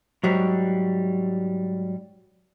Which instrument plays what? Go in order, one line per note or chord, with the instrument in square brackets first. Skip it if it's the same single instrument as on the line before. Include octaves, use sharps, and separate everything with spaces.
[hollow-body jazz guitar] G#2 F#3 G3